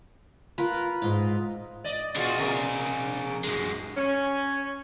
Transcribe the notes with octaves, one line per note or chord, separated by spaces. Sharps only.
F4 A#4 B4
G#2 F4
D5 D#5
B3 D4 F4 F#4 G#4
C3 A#3 A#4
F#2 G#3
C#4